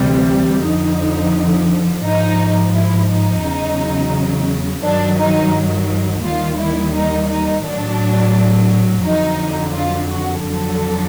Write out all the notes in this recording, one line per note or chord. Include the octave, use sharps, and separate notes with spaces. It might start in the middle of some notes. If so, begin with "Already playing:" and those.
Already playing: D2 C3 E3 G3
F2 D3 F3 D#4
G#2 F3 D#4
E4
D#4
E2 C#3 F#3
G2 D#3 F#3 D4
D#4
D#2 D#3 G3 F4
E4
D#4
D#4
A2 F#3 D4
F2 D3 F#3 D#4
F4
F#4
F2 D3 F#3 A4